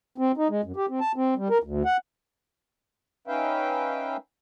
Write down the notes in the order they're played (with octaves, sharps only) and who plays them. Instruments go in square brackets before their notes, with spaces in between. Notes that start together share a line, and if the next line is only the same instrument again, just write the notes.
[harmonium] C4
D#4
G#3
F#2
G4
C4
A5
C4
G3
A#4
D2
F#5
C#4 D#4 B4 E5 F5 G5